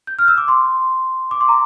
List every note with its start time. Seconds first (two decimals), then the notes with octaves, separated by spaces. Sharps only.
0.07 G6
0.19 F6
0.28 E6
0.38 D6
0.48 C6
1.31 D6
1.41 C6
1.48 A#5